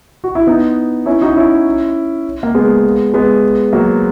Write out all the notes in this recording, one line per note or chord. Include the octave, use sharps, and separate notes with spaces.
F#4
E4
B3 D#4
C#4 E4
D#4 F#4
C#4 E4
A#3
G#3 B3
G#3 B3
F#3 A#3